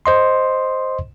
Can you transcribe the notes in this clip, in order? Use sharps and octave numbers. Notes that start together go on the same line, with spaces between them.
C5 D#5 C6